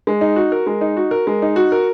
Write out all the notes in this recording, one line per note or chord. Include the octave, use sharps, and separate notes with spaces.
G#3
D#4
F#4
A#4
G#3
D#4
F#4
A#4
G#3
D#4
F#4
A#4